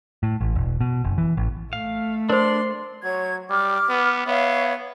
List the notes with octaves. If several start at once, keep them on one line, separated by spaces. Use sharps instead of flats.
A2
A1
E1
B2
F#1
E3
A1
A3 F5
D4 A#4 C5 D5 C6
F#3 C#5 G#6
G3 D6 F6
B3
B3 C#5 E5 F5